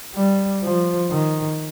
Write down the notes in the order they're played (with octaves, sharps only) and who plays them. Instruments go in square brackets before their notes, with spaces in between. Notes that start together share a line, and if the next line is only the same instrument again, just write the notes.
[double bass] G3
F3
D#3